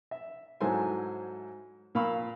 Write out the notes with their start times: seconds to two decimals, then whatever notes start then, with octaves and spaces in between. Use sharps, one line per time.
0.11 E5
0.61 G#2 F#3 E4 A4 C5 G#5
1.95 A#2 F5 B5 C#6 E6